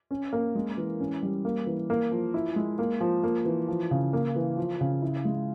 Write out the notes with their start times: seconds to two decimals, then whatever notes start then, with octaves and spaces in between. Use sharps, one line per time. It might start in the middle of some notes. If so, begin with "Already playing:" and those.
0.11 C#4
0.33 A#3
0.55 G#3
0.77 E3
1.00 C#4
1.23 G3
1.45 A#3
1.66 E3
1.90 A#3
2.12 F3
2.34 E4
2.56 G#3
2.79 A#3
3.01 F3
3.23 A#3
3.45 E3
3.68 F3
3.91 C#3
4.13 A#3
4.35 E3
4.57 F3
4.81 C#3
5.02 E4
5.25 G#3